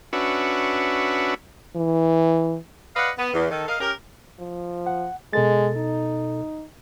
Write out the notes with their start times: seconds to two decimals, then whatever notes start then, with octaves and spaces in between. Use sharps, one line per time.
0.13 C#4 D4 F#4 B4 E5
1.76 E3
2.95 B4 D5 D#5 F5 F#5
3.18 B3
3.33 E2
3.50 D#3 A4
3.68 A#4 D#5 F5
3.80 C#4 G4 A#4
4.39 F3
4.87 F#5
5.33 B2 G#3 A4 A6
5.77 D#4